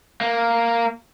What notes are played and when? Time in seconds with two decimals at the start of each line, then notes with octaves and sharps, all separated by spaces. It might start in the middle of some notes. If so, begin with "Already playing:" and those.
0.21 A#3